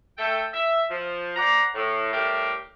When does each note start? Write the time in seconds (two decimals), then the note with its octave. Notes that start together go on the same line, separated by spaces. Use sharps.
0.18 A3 A4 G5
0.53 E5
0.90 F3
1.36 C5 D5 F#5 A#5
1.75 A2
2.13 A2 G3 A3 G4 A#4